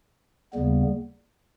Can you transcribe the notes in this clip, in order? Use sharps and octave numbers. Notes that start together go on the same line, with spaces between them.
D#2 C#3 G3 B3